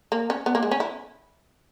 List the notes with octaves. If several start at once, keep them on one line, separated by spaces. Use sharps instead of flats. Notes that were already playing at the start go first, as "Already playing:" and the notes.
A#3
C#4
B3
A#3
G#3
C#4
E4